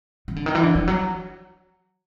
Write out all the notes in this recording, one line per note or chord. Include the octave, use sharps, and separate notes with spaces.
D#3
D3
D#3
E3
D3
F3
F#3